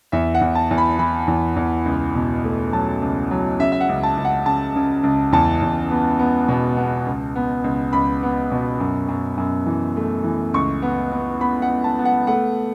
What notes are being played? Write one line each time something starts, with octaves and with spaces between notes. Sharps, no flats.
E2 E5
F#5
E2
A5
E2
B5
E3 B5
E2
E2
C#2
B2
A3
F#3 A5
C#2
F#3
C#3 E5
E5
F#5
C#2
A5
C#2
F#5
C#3 A5
C#3
C#2
E2 A5
E2
B3
B3
B2
B3
C#2
B3
C#2
C#2 B5
B3
B2
F#2
F#2
F#2
E3
A3
E3
C#2 C#6
B3
B3
B3 B5
F#5
B3
A5
B3
F#5
A3 F#5